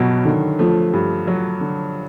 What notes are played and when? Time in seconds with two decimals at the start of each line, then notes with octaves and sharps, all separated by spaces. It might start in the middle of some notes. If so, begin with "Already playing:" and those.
Already playing: G2 B2 F#3
0.25 D3 D#3
0.59 F3 A3
0.93 G2
1.27 F#3
1.61 D3